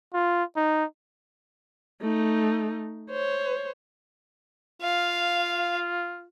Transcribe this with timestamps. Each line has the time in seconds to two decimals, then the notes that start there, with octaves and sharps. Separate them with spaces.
0.14 F4
0.56 D#4
2.01 A3 D#4
3.11 C5 C#5
4.82 F4 F5